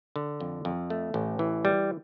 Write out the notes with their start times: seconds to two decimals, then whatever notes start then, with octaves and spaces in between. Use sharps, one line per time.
0.16 D3
0.40 F2
0.65 F2
0.90 A3
1.14 A1
1.39 E3
1.65 G3